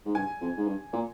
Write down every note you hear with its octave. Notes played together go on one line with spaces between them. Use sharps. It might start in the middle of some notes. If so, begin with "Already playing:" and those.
G#2
G2 G#5
F2
G#2
G2
A#2